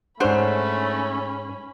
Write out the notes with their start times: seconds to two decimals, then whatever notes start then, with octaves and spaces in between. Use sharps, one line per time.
0.20 G#2 A3 C#4 D4 C5 C#5 F#5 B5